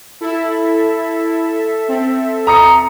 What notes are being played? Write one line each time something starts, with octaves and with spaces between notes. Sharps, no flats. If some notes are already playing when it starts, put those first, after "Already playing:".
E4 A4 E5
C4
A#5 D#6 C#7